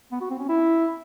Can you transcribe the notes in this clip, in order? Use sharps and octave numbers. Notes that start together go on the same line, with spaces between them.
B3
F#4
C4
C#4
E4